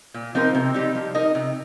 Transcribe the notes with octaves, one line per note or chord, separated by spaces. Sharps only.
A#2
F3 C4 D#4 A#4
C3
G3 C4 D#4
F3
D#4 A#4 D#5
C3